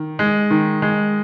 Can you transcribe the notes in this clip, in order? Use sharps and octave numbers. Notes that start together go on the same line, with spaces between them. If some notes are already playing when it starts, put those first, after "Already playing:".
Already playing: D#3
G#3
D#3
G#3